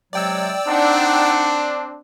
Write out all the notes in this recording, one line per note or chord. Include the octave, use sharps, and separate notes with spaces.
C3 F#3 G#3 D5 G5 E6
C4 D4 D#4 F#5